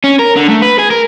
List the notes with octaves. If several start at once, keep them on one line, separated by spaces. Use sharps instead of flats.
C#4
A#4
D3
A3
B4
G#4
A#4